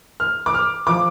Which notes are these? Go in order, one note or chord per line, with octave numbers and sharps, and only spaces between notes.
F6
D6
F6
F3 D6